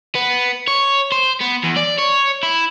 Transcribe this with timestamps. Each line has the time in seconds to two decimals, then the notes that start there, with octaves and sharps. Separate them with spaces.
0.15 B3
0.68 C#5
1.12 C5
1.41 B3
1.64 E2
1.77 D5
1.99 C#5
2.43 E4